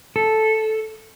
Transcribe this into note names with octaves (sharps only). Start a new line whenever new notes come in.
A4